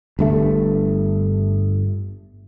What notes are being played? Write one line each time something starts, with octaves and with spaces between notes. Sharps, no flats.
G1 G2 A3